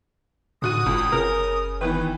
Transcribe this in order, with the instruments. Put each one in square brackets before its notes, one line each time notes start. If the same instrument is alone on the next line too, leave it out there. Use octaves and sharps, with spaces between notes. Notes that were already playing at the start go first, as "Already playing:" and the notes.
[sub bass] A2 [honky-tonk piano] D3 F#4 D#7 [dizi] D#6
[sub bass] F#1 [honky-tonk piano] C#2
[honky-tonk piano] C#3 [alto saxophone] A#4
[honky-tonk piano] D#3 E3 B3 [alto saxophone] B4